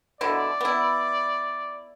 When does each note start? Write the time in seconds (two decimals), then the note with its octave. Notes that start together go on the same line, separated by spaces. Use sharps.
0.21 B2 D3 E4 D5
0.61 B3 E4